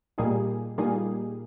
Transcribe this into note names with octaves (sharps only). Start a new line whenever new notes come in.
A#2 G3 A#3 D#4 G#4
A#2 G3 A#3 D#4 G#4